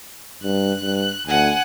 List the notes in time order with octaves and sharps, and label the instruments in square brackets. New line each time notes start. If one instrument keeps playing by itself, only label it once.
[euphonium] G2 [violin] F#6
[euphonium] G2
[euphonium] D2 [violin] F#5 G#5